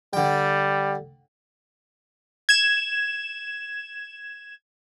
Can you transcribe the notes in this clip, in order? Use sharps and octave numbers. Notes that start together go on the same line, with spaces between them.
D3 G3 G5
G#6 E7